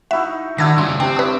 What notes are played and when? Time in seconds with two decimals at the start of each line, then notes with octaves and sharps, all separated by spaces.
0.11 D#4 E4 F#4 E5
0.58 D#3 D4 E4 F#4 E6 G#6 A#6
0.78 C#3 F#3 G3 C6
1.00 C3 C4 D4 G5
1.16 E4 B4 C#5 D#6